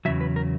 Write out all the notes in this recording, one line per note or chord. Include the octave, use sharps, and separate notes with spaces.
E2 C#3 F#3 E5
B4
A#4